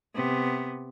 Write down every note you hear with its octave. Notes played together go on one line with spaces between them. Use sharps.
C3 B3